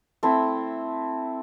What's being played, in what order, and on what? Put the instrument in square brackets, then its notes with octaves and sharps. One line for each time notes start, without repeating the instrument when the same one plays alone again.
[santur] A3 C4 E4